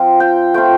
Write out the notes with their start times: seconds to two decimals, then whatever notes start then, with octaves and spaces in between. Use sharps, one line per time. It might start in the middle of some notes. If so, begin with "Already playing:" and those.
Already playing: F3 C4 F4
0.20 G5
0.54 A3 C4 F4 G5